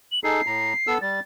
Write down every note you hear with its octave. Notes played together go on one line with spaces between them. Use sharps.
F#7
D#4 G#4 A4 C7
A2 A#5
B3 A4 E6
G3 A6